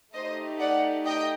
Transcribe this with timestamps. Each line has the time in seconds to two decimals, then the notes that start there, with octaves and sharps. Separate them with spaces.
0.13 A3 D#4 G4 C5 D#5
0.60 D5 F#5
1.06 D#5 G5